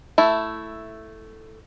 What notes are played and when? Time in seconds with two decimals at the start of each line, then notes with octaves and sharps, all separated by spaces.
0.18 A3 E4